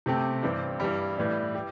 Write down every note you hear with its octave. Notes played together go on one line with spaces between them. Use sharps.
C3 A3 C4 G4
G2 E3 C4 G4
G2 E3 G3
A2 E3 G3
G4